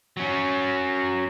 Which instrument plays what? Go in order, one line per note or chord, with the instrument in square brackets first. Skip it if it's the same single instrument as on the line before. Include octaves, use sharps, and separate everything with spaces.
[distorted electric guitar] F#3 C#4